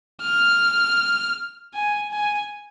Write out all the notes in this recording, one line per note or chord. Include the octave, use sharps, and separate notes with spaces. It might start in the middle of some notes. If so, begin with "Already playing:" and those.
F6
G#5
G#5